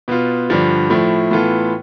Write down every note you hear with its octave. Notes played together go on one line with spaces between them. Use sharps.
B2 B3 F4
G2 D3 F3
A2 F3 A3 E4
A2 E3 B3 F4 A4